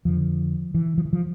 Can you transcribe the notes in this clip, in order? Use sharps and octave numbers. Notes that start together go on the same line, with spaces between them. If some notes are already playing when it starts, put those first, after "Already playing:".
F2 D3 F3
E3
F3
E3
F3